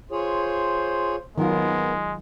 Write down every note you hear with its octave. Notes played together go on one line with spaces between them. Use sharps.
F4 G#4 C5 C#5
D#3 F#3 G#3 B3 F4 A#4